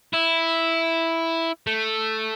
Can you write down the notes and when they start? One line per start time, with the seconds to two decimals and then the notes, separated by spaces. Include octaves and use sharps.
0.14 E4
1.67 A3